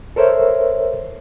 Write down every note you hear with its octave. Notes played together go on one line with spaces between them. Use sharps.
A4 A#4 C5 C#5 E5